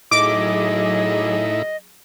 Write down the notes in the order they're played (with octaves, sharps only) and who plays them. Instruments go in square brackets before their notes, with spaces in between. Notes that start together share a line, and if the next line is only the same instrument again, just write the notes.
[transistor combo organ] A2 D#4 E4 [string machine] F#3 G#4 [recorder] D#5 [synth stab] D6